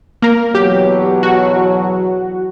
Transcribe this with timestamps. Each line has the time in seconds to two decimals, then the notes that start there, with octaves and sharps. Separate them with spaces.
0.22 A#3 A#4
0.55 E2 B2 F#3 G4
1.23 F#4